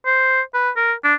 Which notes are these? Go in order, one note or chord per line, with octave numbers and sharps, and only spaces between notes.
C5
B4
A#4
D4